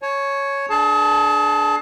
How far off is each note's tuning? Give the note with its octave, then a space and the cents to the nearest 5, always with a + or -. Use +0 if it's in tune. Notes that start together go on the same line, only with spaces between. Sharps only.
C#5 +0 A5 -45
D4 +0 G#4 +35 A5 +0